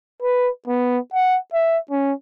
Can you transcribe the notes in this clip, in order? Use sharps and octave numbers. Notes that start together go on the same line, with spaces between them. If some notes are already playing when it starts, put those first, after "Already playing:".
B4
B3
F#5
E5
C#4